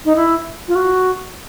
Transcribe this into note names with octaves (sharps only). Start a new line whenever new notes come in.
D#4
E4
F4
F#4